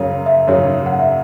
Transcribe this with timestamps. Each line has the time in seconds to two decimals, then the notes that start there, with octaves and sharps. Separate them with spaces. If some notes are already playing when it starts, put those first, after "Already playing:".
Already playing: F#2 C#3 F#3 C#4 G#4
0.26 E5
0.47 F#2 C#3 F#3 C#4 G#4 C#5
0.86 F#5
1.00 E5